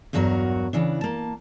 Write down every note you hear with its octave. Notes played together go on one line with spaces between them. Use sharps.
E2 G2 F#3 F#4 A#4
C#3 E3 D4
A#3 A5